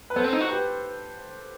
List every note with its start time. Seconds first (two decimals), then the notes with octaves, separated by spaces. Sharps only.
0.10 B4
0.16 B3 A4 C5
0.24 C4
0.33 D#4
0.41 F#4
0.49 G4 B4